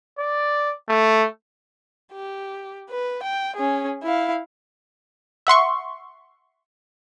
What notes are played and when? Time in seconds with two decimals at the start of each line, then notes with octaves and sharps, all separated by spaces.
0.19 D5
0.89 A3
2.13 G4
2.91 B4
3.23 G5
3.56 C#4 G#4
4.03 E4 F5
5.47 E5 F#5 C6 C#6